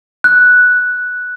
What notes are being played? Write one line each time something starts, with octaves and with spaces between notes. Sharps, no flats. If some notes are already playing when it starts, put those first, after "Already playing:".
F#6